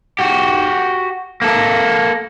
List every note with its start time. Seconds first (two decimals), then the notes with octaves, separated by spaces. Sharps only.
0.19 F#4 G4
1.42 A#3 A4